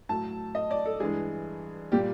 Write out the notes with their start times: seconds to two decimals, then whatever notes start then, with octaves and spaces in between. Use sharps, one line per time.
0.09 A2 F#3 A5
0.55 D#5
0.71 D5
0.86 A4
1.00 G2 E3 G#3 G#4
1.92 A#2 G3 G4